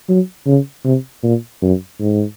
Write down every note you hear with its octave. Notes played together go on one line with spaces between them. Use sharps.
F#3
C#3
C3
A#2
F#2
G#2